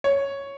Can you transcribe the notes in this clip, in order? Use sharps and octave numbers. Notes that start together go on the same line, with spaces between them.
C#5